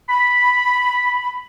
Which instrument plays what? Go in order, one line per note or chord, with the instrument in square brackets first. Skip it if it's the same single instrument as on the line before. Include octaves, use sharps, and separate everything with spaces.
[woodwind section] B5